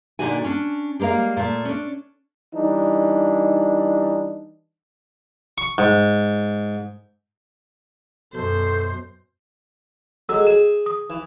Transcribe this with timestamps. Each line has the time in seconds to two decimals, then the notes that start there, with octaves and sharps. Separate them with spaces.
0.19 A#2 D3 D#4 F#4 G#5
0.44 C#4 D4
1.00 G3 G#3 A#3 A#4 F5
1.37 A#2 A3
1.65 C#4 D4
2.54 E3 G3 D4 D#4
5.58 C#6
5.78 G#2
8.34 F#2 B2 A4 C5
10.29 F#3 G#3 A4 E6
10.47 G#4 E7
10.86 D#6
11.10 E3